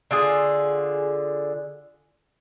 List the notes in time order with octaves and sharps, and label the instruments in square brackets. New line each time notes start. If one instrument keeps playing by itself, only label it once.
[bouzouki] D3 F4 G#4